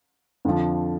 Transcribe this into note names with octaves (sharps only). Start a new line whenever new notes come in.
F2 D3 F3